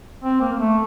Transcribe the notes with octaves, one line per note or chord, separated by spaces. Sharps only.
C4
A#3
A#3
A3